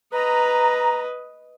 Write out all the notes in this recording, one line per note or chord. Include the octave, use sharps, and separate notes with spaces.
B4 D#5 A#5